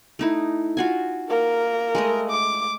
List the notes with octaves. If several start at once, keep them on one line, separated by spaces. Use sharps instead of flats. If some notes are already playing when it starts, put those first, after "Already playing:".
A3 D#4 E4
F4 F#4 G#5
A#3 A#4
G#3 A3 D#5
D6